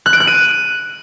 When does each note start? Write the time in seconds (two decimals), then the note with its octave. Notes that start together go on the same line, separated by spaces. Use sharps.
0.06 F#6
0.13 D7
0.20 F#6
0.27 D#7